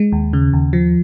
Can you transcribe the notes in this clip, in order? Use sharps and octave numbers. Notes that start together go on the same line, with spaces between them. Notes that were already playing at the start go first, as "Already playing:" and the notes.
Already playing: G#3
D#2
C#3
D#2
F3